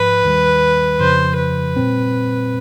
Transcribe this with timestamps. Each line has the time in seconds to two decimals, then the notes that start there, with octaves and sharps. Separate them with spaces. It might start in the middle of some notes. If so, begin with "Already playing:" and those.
Already playing: G#2 F3 B4
0.23 D#2 D#3 G3
1.00 F2 C#3 F3 C5
1.38 B4
1.76 A#2 G3 C4